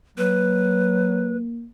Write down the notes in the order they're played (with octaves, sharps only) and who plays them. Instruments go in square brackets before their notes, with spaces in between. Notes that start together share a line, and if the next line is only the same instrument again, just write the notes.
[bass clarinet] F#3 [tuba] A#3 [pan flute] B4